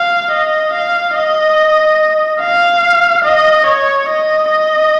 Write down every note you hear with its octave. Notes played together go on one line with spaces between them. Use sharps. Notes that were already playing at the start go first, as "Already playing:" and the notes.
Already playing: F5
D#5
F5
D#5
F5
D#5
C#5
D#5
D#5